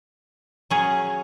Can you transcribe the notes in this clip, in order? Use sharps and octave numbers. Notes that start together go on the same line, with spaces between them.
F#3 C#4 G#4